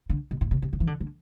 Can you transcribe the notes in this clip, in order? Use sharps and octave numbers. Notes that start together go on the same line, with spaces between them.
D3
B2
A2
C3
C3
D3
E3
D3
D3